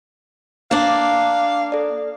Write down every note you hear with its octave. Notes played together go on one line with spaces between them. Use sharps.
A#3 D4 F5
A4 D5